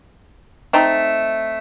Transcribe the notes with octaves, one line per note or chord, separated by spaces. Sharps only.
A3 C4 D#4